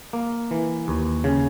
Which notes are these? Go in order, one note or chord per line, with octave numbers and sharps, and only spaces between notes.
A#3
E3
D#2
C#3